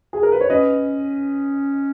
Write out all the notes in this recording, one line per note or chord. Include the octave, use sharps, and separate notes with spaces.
G#4
A#4
B4
C#5
C#4 B4 D#5